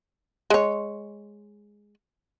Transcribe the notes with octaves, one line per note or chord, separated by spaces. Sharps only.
G#3 C#5